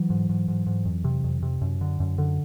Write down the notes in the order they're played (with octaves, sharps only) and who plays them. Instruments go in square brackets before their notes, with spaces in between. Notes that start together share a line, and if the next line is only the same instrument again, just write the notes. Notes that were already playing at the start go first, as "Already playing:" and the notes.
Already playing: [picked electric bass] E3 F#3
G#2
G#2
G#2
G#2
F2
C3
F2
C3
F#2
D3
F#2
D3